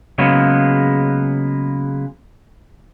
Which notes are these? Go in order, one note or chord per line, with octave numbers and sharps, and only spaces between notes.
C#3 F#3 G#3 A#3 B3